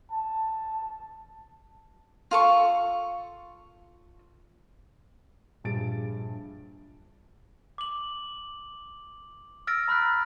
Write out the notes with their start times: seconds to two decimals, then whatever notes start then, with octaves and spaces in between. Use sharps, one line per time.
0.12 A5
2.31 F4 A4 C#6
5.64 A#1 G2 G#4 A6 D7
7.78 D6 F#7
9.67 E6 F6 A6 A#6 D7
9.88 A#5 B5 F6 F#6 B6